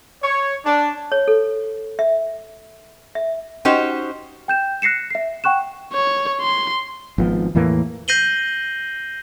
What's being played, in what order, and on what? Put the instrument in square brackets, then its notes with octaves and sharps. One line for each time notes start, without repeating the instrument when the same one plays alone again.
[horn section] C#5
D4
[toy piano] C#5
A4
E5
E5
[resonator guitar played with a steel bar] C#4 D#4 F#4 G4 C5
[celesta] G5 G6 E7
F#6 A#6 C7 C#7 E7
E5 C7
F#5 G5 C#6 F#6 E7
[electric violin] C#5
C6
[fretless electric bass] G#1 F3 B3
E2 A2 E3 A#3
[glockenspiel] G6 A#6 C7 D#7 F#7 G7